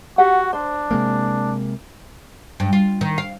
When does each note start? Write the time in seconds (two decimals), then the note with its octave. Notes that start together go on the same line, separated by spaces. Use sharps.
0.18 F#4 G4 F#5
0.53 D4 C5
0.91 C3 G#3 A#3
2.60 G2
2.73 F4
3.01 D#3
3.18 F5